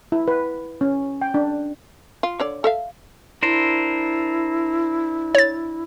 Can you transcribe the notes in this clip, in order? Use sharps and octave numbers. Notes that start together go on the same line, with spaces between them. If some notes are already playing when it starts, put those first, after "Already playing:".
E4
B4
C#4
G5
D4
F4
D3 C#5 D5
A4 E5 F5
D4 E4 A#4 C5
C#5 A6